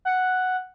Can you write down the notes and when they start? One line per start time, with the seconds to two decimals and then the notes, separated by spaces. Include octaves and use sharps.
0.05 F#5